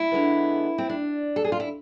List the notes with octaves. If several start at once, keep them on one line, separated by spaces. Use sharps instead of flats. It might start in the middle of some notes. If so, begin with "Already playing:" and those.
Already playing: E4
D3 G#3 B3
C4
D4
A4
G#4
F4
E4